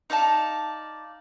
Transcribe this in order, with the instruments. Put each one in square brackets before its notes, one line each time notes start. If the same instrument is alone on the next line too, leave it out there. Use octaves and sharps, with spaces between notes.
[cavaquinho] D#4 D5 F5 A5